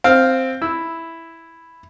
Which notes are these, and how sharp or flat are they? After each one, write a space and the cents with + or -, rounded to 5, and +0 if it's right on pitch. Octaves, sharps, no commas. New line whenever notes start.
C4 +0 F5 +0
E4 +0 E6 -10